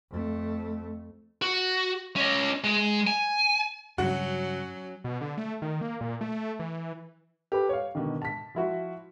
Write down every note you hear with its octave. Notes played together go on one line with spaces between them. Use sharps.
F2 A3
F#4
C#4 D#5
G#3
G#5
G2 C#3 F#3 C#4 F#4
B2
D3
A3
D#3
A#3
A#2
A3
E3
G4 A4 B4
C#5 F5
B2 D3 D#3
A5 B6
F3 E4 F#4